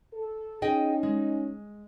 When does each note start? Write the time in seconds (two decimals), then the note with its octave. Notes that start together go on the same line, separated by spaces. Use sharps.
0.14 A4
0.62 C#4 D#4 G#4 D#5 G5
1.03 G#3